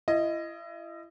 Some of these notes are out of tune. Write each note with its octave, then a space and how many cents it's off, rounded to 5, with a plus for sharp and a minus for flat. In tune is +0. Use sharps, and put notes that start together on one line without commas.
E4 +35 D#5 +0